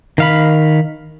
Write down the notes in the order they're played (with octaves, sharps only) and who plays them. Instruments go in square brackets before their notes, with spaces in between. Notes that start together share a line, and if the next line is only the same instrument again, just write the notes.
[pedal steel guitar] D#3 F5 B5